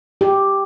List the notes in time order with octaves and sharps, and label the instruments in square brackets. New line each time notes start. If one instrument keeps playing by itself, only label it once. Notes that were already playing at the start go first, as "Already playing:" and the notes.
[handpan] G4